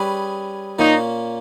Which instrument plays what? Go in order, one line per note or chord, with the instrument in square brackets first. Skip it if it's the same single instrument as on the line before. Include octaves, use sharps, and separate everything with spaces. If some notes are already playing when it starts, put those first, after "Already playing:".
Already playing: [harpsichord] G3 C#4 G#4 B4
[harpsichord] A#2 A#3 C#4 [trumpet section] D#4